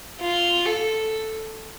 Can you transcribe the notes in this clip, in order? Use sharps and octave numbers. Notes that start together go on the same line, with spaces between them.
F4
A4